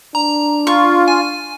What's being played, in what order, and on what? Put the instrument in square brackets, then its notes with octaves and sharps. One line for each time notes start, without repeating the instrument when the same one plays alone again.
[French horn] D4 [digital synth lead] A#5
[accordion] F4 [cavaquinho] C#6
[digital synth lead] G#5